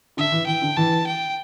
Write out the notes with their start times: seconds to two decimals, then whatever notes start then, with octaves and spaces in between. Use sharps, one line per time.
0.17 D3 E5
0.32 E3
0.47 E3 G5
0.62 D3
0.77 E3 A5
1.07 G5